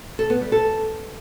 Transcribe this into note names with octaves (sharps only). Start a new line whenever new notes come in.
A4
B3
G3
A4